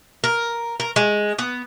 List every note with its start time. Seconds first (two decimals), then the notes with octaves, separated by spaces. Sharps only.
0.24 A#4
0.80 A#4
0.96 G#3
1.39 B3